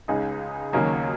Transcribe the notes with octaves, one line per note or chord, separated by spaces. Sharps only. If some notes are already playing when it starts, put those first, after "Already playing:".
C#2 C#3 G#3 D#4 G#4
D#2 C#3 F#3 A#3 D#4